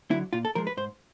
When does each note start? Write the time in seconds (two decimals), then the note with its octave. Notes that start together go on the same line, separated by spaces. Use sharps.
0.11 D3 F#3 E4
0.33 A#2 F4
0.45 A4
0.55 F3 G#3 A#4
0.67 B4
0.77 G#2 C5